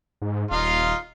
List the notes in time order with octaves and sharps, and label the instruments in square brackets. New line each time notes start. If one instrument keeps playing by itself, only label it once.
[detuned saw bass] G#2
[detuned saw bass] D#1 [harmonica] D#4 F4 F5